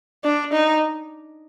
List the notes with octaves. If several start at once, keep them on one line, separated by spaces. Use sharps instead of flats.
D4
D#4